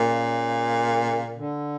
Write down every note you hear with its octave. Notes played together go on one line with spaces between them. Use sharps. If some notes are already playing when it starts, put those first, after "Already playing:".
Already playing: A#2 C#3
D3